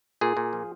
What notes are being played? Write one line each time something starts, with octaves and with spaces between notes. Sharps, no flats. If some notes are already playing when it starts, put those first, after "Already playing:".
A#2 G#4
A#2
F3